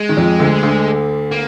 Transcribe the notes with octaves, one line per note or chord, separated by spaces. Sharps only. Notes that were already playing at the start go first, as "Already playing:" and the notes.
Already playing: G#3
D#3
F2 F3
D2 D3
D2 D3
A#3